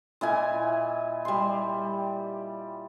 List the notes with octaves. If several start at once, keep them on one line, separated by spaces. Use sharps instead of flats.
A#2 E4 D#5 G#5
G3 C6